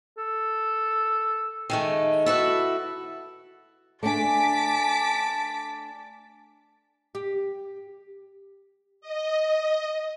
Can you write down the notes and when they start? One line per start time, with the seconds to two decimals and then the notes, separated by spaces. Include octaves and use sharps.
0.18 A4
1.70 D#3 G#3 A3
2.26 E4 F#4 A4 B4
4.03 A3 D4 D5 G#5 A5 D6 B6 D7
7.15 G4
9.01 D#5